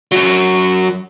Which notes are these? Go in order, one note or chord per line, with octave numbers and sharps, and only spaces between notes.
F#2 F#3